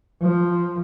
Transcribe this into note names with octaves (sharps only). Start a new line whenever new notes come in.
F3